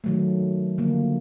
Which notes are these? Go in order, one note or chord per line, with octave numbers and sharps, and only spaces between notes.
D#3 F#3 A3
D3 F3 A#3